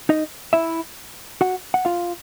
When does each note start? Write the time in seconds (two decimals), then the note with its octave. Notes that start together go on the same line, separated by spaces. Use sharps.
0.09 D#4 D#5
0.53 E4 E5
1.41 F#4 F#5
1.74 F#5
1.85 F4 F5